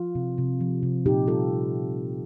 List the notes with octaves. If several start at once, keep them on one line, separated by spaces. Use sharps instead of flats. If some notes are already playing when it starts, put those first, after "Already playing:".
Already playing: F3 F4
C3
C3
F3
C3
A#2 D#4 G4
G3 F4 A4